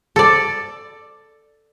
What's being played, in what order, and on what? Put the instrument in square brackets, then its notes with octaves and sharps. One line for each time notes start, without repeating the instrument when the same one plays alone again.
[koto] A4 D5